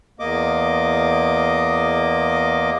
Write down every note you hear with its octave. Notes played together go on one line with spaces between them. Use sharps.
E2 A#3 D#5 D6